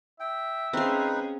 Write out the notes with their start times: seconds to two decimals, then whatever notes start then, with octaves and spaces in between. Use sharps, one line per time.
0.20 E5 G5
0.73 C4 C#4 D#4 G#4 B4 F5